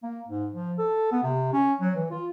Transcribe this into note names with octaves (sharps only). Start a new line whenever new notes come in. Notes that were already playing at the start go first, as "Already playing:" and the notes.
A#3
G#2
F3
A4
B3
C3
C#4
F#3
E3
F4